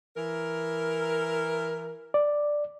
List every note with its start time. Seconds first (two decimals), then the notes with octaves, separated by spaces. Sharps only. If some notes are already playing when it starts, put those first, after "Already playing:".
0.17 E3 A#4
2.14 D5